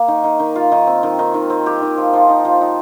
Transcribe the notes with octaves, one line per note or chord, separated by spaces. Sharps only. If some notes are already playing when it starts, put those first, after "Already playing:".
Already playing: A#3
D#3
D#3
D#3
F4
D#3
C4
D#3
D#3
D#3
C4
G4
D#3
F3
F3
D#4
F3
D#4